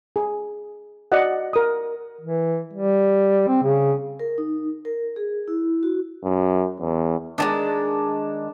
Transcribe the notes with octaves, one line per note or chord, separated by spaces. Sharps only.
G#4
F#4 D5 D#5 F#5
A#4 D#6
E3
G3
C4
C#3
A#4
D#4
A#4
G#4
E4
F#4
F#2
E2
D#3 F#3 G#3 D4 A5